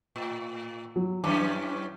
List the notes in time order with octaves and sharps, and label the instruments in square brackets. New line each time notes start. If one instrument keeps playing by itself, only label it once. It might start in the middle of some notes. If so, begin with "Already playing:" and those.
[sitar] A2
[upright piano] F#3
[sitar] F#2 E3 C#4 [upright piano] D6